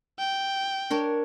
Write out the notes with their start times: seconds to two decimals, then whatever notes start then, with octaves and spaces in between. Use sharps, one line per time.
0.19 G5
0.90 D4 A#4 C#5